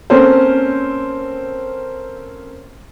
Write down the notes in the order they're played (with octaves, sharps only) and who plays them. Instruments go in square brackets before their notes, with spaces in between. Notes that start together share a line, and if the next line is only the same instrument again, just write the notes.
[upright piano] A#3 C4 C#4 A4 A#4 C5